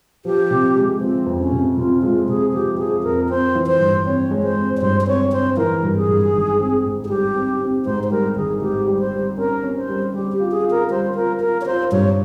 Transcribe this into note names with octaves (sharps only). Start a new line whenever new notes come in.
F3 G4
C3
G#3
F3 C4
F2
C#4
C3
C3 F4
G#3 F4
C3 G#4
F3 G4
F3 G#4
F2 A#4
C4 C5
E3
C5
G2
C4 C#5
G#3
C5
C4
C#5
G2 C5
C5
C4 C#5
C4 C5
E3 A#4
G2
G#4
G2
G#1
C4
G#2
G#4
G3 G4
C4
C4
G#2 C5
C5
G3 A#4
G#1 G#4
G#2 G4
G3
C5
G3
C#4 A#4
C#4
C5
G3
G3 G4
G4
F4
G#4
F4
A#4
G3 C5
F4 A#4
F4 A#4
C#5
F4 C5
G2 C#5